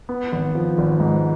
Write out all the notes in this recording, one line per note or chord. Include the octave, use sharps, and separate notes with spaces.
B3
G#1
F3
G#1
G#2